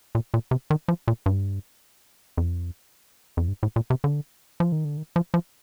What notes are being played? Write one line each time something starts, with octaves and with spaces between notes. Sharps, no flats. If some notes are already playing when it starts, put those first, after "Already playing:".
A#2
A#2
C3
D#3
F3
A#2
G2
F2
F2
G2
A2
A#2
C3
D3
F3
D#3
D3
D#3
F3
F3